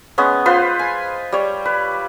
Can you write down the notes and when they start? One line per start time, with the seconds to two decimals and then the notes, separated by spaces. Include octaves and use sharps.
0.18 G#3 B3 C#4
0.46 F4 B4 C5 C6
0.79 G#5
1.32 G3 C#5
1.65 B4